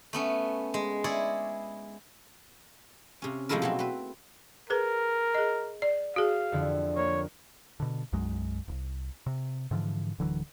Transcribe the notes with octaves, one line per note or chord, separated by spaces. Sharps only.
A3 B3 C#4
G#3
E4 G#4 C#5 D5
C3 C#4
C3 F3 G#3 A3 E4 A#4
B2 F#3 C4
C4 B4
G#4 A#4 B4
G#4 D#5
D5
F#4 G#4 F5
F2 D3 E4
A#3 C#5
B2 D3
B1 F#2 F#3 G#3
D1 C2
C3
G#2 D3 E3 F3
D1 D3 E3 F#3